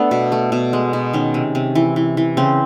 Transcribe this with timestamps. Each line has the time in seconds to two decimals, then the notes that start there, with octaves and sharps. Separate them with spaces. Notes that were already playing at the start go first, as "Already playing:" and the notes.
Already playing: A3 B3 D4
0.11 B2
0.32 A3
0.52 B2
0.73 G#3
0.93 B2
1.13 D#3 C#4
1.34 C3
1.55 C3
1.75 E3
1.96 E3
2.17 E3
2.37 C#3 C4